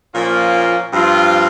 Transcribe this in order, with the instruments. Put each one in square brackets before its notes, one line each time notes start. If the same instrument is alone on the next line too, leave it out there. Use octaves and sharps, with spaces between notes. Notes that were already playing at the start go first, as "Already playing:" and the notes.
[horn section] A#2 F3 A#3 C#4 F4
G2 F3 C4 F4